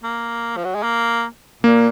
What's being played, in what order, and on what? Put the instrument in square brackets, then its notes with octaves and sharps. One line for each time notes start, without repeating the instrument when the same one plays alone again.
[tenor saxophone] A#3
F3
F#3
G#3
A#3
[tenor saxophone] A#2 [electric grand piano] A#3